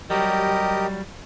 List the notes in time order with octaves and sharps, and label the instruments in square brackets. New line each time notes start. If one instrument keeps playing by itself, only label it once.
[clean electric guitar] F#3 G3 [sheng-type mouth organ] G4 A#4 D#5